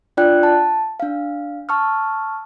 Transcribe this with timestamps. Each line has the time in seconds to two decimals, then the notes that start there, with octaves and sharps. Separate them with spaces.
0.17 D4 F4 D5 G5 F#6
0.43 A5
1.00 D4 F5
1.69 A5 C#6 E6 F6